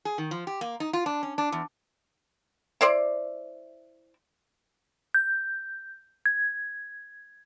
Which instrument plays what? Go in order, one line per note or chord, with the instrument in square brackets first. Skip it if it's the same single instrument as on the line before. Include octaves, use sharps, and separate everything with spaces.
[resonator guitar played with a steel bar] G#4
D#3
F3
G4
A#3
D#4
F4
D4
C#4
D4
E2
[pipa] E4 C5 D5
[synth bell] G6
G#6